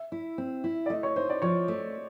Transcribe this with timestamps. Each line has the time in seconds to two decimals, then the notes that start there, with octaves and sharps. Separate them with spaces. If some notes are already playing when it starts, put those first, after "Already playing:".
Already playing: E5
0.12 E4
0.38 C4
0.64 E4
0.86 D5
0.90 A3 D#5
1.03 C#5
1.16 D#4 C5
1.30 D5
1.42 F3 C#5
1.68 A3